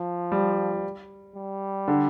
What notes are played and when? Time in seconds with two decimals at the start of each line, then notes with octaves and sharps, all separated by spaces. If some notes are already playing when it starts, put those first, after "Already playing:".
Already playing: F3
0.32 G3
1.36 G3
1.88 D3